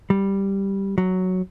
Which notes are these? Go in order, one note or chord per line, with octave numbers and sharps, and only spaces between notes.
G3
F#3